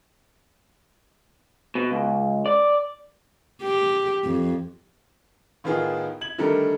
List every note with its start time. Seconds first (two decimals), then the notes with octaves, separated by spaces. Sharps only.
1.75 B2
1.91 C#2
2.46 D5
3.63 G4
4.24 F2
5.64 A2 D#3 B3 F4 G#4
6.21 G#6 F#7
6.38 D3 D#3 G3 A3 A4 A#4